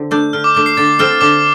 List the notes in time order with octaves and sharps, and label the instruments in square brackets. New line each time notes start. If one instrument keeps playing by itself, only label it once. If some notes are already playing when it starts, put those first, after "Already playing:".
Already playing: [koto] D3 C4
[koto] A3 D4 [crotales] G6
[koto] D3 [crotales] F6
[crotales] D6
[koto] A3 D4 [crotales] D6
[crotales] C7
[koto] D3 [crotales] A6
[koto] A3 C4 F4 A4 [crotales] F6
[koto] D3 [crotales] D6